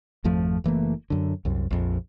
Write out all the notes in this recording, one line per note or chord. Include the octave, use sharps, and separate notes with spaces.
G#1 F2 F3 A3
F#1 E3 A3 A#3
F#2 D3
C2 F#2
A#1 F2